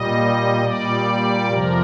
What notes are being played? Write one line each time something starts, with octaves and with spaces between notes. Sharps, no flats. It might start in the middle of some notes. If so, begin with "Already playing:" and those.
Already playing: A#2 G3 D#5
A#2 G3 D5
F2 C3 F3 A#4